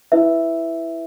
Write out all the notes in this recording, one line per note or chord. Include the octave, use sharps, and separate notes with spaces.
E4 B4 E5